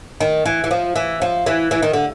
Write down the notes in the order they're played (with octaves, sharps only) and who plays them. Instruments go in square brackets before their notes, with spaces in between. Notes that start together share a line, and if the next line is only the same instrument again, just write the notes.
[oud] D#3
E3
E3
F3
E3
F3
E3
E3
D#3
D3